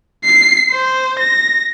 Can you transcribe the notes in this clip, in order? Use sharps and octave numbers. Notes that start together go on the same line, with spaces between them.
C7
C5
A#6